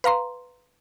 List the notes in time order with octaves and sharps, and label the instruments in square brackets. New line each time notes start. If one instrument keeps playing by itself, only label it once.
[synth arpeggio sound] B4 F5 A#5 C6